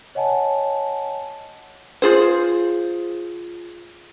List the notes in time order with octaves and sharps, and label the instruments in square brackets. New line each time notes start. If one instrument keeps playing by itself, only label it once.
[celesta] C#5 D#5 F#5 G#5 A5
[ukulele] F4 G#4 C5